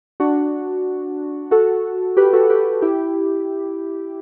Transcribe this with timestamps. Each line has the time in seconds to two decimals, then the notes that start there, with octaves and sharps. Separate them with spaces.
0.20 D4 F#4
1.51 F#4 A4
2.17 G4 B4
2.33 F#4 A4
2.50 G4 B4
2.82 E4 G4